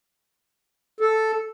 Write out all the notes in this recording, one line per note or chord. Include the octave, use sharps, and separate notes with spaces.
A4